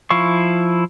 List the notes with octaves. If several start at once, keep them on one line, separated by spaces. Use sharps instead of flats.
F3 E4 F5 C#6